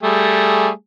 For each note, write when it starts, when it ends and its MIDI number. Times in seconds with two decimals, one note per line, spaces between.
0.03 0.69 55
0.03 0.69 57
0.03 0.69 68